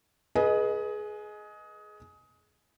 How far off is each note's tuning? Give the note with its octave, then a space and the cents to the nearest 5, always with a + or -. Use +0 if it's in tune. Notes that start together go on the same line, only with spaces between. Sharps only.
G#4 +20 B4 -20 D#5 +0